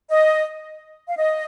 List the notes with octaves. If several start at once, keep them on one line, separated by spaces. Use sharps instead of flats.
D#5
F5
D#5